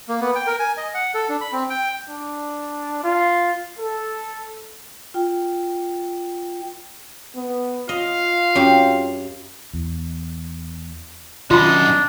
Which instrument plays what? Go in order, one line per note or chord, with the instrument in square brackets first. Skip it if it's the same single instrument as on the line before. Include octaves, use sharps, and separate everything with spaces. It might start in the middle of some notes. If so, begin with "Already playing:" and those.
[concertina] A#3
B3
G5
A#4
G#5
D#5
F#5
A4
D4
B5
C4
G5
[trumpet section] D4
F4
A4
[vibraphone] F4 G5
[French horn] B3
[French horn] F4 [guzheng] D#5 [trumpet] F5
[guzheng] F#2 G4
[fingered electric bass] E2
[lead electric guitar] F#2 D#4 [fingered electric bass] D#3 [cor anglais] D4 [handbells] F4 B5